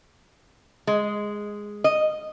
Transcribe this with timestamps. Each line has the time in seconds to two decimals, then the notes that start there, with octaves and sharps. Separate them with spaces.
0.87 G#3
1.84 D#5